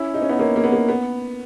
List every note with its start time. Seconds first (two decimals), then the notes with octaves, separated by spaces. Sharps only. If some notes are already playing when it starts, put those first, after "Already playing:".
Already playing: C#4 E4
0.14 D#4
0.22 C#4
0.29 B3 D#4
0.39 A#3 C#4
0.56 A#3
0.64 B3
0.72 A#3
0.89 B3